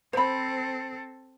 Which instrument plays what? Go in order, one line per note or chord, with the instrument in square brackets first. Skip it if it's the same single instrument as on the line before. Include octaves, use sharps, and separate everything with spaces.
[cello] C4 A4 [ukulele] C5 B5